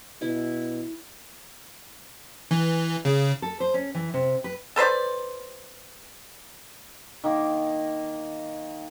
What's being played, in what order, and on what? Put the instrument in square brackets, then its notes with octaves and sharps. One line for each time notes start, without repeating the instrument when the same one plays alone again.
[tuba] B2 [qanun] E4
[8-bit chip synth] E3
C#3
[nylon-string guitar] A4
C5
C#4
E3
C3
B4
[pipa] A4 B4 C5 D5
[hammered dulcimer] D#3 A#3